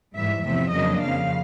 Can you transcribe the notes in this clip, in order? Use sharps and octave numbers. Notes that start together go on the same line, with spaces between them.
G#2 E3 G3 E5
E2 C3 F3 A3 E5
F2 C#3 F#3 A#3 D4 D#5
F2 C#3 F3 F5